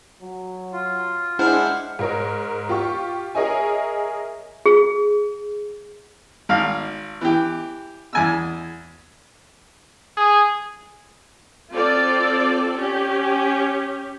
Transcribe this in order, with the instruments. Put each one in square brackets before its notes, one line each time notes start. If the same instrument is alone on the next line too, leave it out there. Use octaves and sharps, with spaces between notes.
[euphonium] F#3
[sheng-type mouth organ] F4
[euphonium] G#3 [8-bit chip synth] D4 E4 C5 [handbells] F#5 F6
[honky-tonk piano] G#2 A#4 C#5
F4 G4 C#6
G#4 A#4 C#5 D#5 E5 G#5
[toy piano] G#4
[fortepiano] G#1 F5
E3 G4
E2 G#5 E6
[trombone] G#4
[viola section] C4 F4 A4 D5
C#4 G4